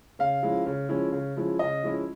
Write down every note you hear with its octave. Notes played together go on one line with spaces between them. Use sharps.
C#3 F5
F3 G#3 C#4 E4
C#3
F3 G#3 C#4 E4
C#3
F3 G#3 C#4 E4
C#3 D#5
F3 G#3 C#4 E4